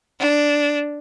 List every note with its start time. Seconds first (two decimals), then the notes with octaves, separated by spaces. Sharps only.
0.19 D4